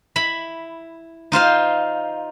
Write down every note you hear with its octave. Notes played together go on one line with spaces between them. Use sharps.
E4 B5
D#4 F4 C5 F5